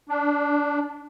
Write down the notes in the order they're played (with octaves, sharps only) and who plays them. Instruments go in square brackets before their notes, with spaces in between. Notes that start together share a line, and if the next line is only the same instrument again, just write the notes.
[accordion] D4